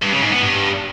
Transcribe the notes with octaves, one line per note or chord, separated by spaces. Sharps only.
G2
C#3
G#2
B3
G2